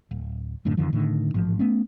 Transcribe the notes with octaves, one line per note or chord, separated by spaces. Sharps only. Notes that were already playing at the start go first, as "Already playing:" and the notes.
D1
F#2 A2 D3
F2 D3 D#3 F3
A2 D3 D#3
A1 G#2 F3
A3 B3 C#4